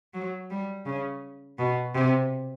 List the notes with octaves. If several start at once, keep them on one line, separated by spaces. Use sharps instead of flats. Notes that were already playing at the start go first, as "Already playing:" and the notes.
F#3
G3
C#3
B2
C3